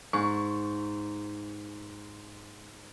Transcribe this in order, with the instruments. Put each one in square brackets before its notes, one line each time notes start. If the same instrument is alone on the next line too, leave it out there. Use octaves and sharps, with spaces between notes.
[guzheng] G#2 [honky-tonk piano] C#6